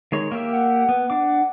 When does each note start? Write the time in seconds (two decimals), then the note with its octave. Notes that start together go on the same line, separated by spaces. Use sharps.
0.12 D#3 G#3 C#5
0.31 A#3 G4 E5
0.53 F#5
0.89 B3
1.10 D4 D6